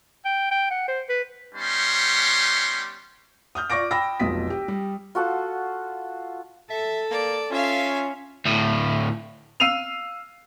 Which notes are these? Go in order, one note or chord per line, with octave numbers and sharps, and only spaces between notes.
G5
G5
F#5
C5
B4
G3 B3 C#4 D#4 F#5 C6
D#6 F6 G6
F4 D5 C#6 D6 A#6 D7
G5 B5 E6 A#6
F1 B1 F4 D#6 B6
G4
G3
F4 F#4 A4 F#5
A4 E5
A#3 D5
C#4 F4 E5 F5
D2 A2
F5 E6 C7 D#7 F7